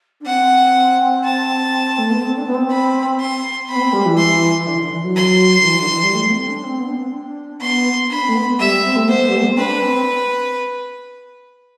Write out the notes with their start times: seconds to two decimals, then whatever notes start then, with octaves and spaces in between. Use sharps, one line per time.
0.21 D4
0.26 C4 F#5
1.24 A5
1.98 A3
2.10 B3
2.21 C4
2.38 D4
2.46 B3
2.54 C4
2.71 B5
3.20 C6
3.69 C4 B5
3.76 B3
3.81 C4
3.93 G3
4.06 E3
4.17 C6
4.67 D3
4.75 E3
4.79 D3
4.92 E3
5.04 F#3
5.16 C6
5.60 D3
5.64 E3
5.78 D3
5.89 E3
6.02 G3
6.14 A3
6.30 C4
6.41 C4
6.47 D4
6.64 C4
6.79 B3
6.88 D4
6.96 C4
7.12 D4
7.61 B3 C6
8.10 D4 B5
8.22 C4
8.29 A3
8.35 B3
8.47 B3
8.59 G3 E5
8.84 C4
8.96 A3
9.08 B3 C5
9.29 G3
9.36 A3
9.42 B3
9.49 C4
9.57 D4 B4
9.69 D4
9.82 C4
9.94 C4